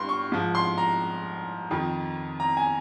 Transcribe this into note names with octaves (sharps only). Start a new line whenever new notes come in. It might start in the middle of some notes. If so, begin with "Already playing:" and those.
Already playing: G2 C6
C#6
G#2 F3
C6
A#5
F2 D#3
A#5
G#5